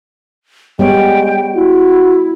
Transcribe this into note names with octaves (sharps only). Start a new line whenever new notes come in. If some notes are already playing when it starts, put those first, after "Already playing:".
G3 G#3 B3 C#5 G5
E4 F#4